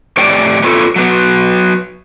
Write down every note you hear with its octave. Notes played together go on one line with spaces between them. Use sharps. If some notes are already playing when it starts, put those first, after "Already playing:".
F2 A2 G4 C#5 D5 G5
B3 C#4 F4 A4 B4 C#5
F#3 B3